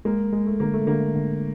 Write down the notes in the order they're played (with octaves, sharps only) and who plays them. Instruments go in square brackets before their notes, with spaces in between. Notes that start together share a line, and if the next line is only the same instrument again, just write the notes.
[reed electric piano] G#3 [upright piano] A#3
[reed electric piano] G#3
[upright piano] A3
[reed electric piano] D3 [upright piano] A#3
[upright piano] A3
[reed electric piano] D3 [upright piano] A#3
[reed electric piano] D3